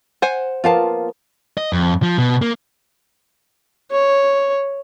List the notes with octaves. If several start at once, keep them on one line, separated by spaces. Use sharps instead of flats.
C5 F#5 G#5
F3 A#3 B3 F4 F5 A5
D#5
F2
F3
B2
A#3
C#5